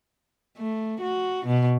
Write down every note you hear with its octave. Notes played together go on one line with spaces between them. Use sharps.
A3
F#4
B2